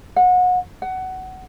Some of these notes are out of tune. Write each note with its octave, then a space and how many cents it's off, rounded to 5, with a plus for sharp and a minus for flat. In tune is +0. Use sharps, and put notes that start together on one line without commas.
F#5 -30
F#5 +20